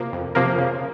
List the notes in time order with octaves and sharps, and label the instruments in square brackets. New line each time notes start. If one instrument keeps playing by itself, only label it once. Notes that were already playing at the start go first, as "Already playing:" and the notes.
Already playing: [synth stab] C3 F3 A#3
F2
C3 F3 A#3
C#3